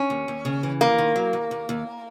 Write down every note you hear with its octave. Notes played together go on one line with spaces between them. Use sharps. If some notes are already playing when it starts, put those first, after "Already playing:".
Already playing: C#4
D#2
D#2
C#3
E3
D#2 A#3
D#3
F#3
D#2
D#2
D#2